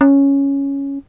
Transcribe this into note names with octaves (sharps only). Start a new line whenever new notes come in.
C#4